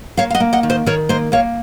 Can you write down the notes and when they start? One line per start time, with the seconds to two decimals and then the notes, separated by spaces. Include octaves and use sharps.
0.17 A#3 C#5 F5
0.30 F5
0.34 D#5 F#5
0.40 A#3
0.53 D#5 F#5
0.63 D#3
0.70 C5 D#5
0.86 D#3 A#4 C#5
1.09 A#3 C5 D#5
1.32 A#3 C#5 F5